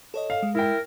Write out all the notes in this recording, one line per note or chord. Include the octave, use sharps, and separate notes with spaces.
A4 C#5 D#5
F5
G#3
E4 A#4 G5